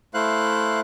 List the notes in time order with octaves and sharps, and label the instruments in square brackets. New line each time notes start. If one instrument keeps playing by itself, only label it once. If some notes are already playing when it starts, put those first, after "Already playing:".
[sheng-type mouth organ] A3 E4 C5 F5 F#6